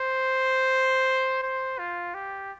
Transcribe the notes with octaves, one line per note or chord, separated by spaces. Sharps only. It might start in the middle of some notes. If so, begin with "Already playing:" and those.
Already playing: C5
C5
F4
G4